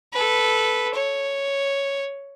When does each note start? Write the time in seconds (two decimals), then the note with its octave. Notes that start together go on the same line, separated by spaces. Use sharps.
0.13 A4 B4
0.94 C#5